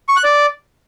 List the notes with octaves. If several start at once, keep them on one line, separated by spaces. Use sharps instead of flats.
C#6
F#6
D5